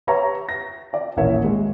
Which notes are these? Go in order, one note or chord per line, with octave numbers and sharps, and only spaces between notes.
G4 B4 C#5 E5 A#5 C#6
A#6
D5 E5
D#1 A1 A#4 C#5 E5
G#3